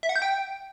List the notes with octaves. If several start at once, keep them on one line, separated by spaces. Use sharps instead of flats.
E5
F#5
G6
G5